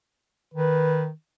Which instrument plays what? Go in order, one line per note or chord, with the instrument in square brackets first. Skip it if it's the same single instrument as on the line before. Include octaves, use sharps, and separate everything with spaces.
[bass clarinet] D#3 [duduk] B4